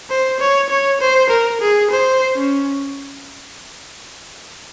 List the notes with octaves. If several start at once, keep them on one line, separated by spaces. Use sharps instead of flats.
C5
C#5
C#5
C5
A#4
G#4
C5
C#4